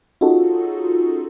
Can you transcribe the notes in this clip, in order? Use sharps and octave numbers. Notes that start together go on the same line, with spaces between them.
C#4 D#4 F4 F#4 G#4 A4